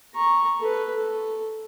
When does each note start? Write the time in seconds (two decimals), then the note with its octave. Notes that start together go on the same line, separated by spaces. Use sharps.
0.15 A#5 C#6
0.60 A4 B4
0.96 A4